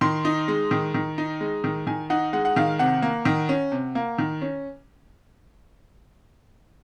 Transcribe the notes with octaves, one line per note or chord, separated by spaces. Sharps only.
D#3 C6
D#4
G#3
D#3
D#3
D#4
G#3
D#3
D#3 G#5
D#4 F#5
G#3 F#5
F#5
D#3 F5
C3 F#5
A#3
D#3
C#4
C3
A#3
D#3
C#4